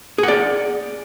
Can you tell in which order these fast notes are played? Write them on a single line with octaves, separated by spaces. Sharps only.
G#4 F#5 D5